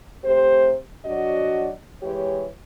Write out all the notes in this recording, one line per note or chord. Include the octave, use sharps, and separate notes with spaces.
C3 A3 G4 C5
F#3 D4 F#4 D5 D#5
E3 G#3 G4 C#5